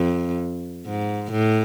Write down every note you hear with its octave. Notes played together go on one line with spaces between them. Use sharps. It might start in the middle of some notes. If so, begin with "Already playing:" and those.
Already playing: F2
G#2
A2